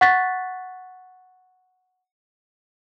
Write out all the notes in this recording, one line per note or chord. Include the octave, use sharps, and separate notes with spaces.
F#5 C#6 F#6 A6 B6